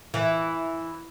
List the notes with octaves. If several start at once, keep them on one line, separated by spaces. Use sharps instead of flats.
E3